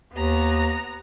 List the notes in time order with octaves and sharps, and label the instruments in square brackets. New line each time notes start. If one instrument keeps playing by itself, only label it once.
[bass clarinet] D#2 [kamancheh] B3 A#5